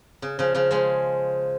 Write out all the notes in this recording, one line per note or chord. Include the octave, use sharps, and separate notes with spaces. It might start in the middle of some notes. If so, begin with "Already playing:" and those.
C#3
C#3 F3
C#3 F3
F3 G#3